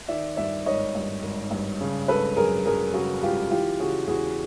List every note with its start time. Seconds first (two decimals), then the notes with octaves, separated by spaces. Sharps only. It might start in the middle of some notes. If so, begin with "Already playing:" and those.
0.08 D#3 D5 E5
0.37 G2 D5 E5
0.66 G#1 C#5 D#5
0.95 G2
1.23 G#1
1.51 G2
1.81 C#3
2.08 G#1 A4 B4
2.37 F#2 G#4 A#4
2.66 F#2 G#4 A#4
2.94 C#3 F#4 G#4
3.23 G#1 F4 G4
3.51 E3 F4 G4
3.80 C#3 F#4 G#4
4.08 E2 F#4 G#4